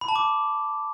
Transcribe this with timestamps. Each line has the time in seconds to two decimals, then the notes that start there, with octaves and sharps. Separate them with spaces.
0.01 B5
0.08 A5
0.16 D6